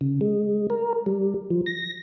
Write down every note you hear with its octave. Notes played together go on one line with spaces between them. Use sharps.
C#3
G#3
A#4
G3
F3
A#6